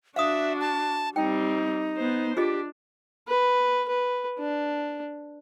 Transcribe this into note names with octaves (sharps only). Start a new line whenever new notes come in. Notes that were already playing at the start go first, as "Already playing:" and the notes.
D4 F#4 E5 F5 D#6
A5
G3 C4 D#4 G5
B3 C5
D4 F4 G4 G#4 D#5
B4
B4
D4